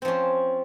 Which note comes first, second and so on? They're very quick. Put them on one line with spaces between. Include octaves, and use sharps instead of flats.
C4 F3 C#4